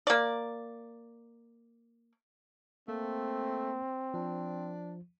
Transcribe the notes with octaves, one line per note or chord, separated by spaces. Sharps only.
A#3 D5
A3 A#3 C4
F3 D4